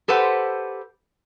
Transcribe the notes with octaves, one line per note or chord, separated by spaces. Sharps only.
G4 A4 B4 C5 F#5